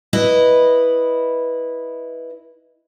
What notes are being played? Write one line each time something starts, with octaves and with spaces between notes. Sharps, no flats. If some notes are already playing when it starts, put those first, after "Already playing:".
E4 B4 D#5